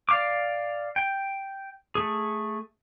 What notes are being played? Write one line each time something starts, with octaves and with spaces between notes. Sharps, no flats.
D5 F5 D6
G5
A3 G#4